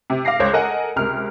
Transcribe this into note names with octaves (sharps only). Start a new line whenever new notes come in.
C3
F5 D6 A#6 C7
C#2 C5 C#5 D6
A4 A#4 D#5 F#5 G#5
C#2 C3 A#4 F6